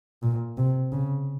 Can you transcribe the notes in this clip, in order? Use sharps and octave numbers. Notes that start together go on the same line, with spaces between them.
A#2
C3
C#3